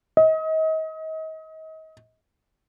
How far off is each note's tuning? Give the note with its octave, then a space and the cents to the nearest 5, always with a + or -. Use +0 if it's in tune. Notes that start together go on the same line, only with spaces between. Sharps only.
D#5 +35